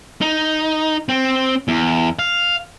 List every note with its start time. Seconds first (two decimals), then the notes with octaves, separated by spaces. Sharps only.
0.21 D#4
1.09 C4
1.68 E2
2.19 F5